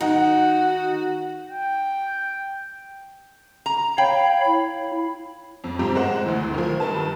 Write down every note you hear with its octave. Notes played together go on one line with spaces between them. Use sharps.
D#3 D#4 F#4 F#5
G5
A#5
C#5 F5 G5 B5
E4
F2
G#2 F3 C4 G4
G#3 C5 F#5
D2 E3
D#3 F3
G2 D#3 B4 A5